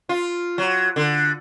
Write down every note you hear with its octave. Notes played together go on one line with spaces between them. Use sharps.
F4
F#3
D3